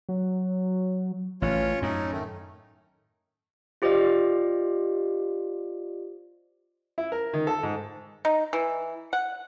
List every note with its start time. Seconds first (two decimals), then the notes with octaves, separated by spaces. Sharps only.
0.09 F#3
1.42 A1 C#4 F4 C#5
1.82 F#2 A2 C#4 D#4
2.12 D#3 A3
3.82 F4 G4 C5 D5 D#5 F5
6.98 E4
7.12 A#4
7.34 D#3
7.47 A4
7.63 G#2
8.25 D#4
8.53 E3
9.13 F#5